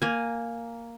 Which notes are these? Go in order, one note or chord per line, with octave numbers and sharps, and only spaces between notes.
A#3 G#5